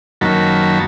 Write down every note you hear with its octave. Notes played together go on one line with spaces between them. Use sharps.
F#2 D#3 F#3 A#3 A5 B5